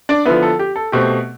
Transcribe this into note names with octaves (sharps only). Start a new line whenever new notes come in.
D4 D5
D3 F3 B3 E4 B4
A4
G4
A4
B2 A3 C4 G4